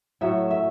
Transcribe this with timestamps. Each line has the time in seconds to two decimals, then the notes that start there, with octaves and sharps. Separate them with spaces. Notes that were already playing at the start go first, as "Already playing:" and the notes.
0.21 A2 F#3 A3 E5
0.51 E5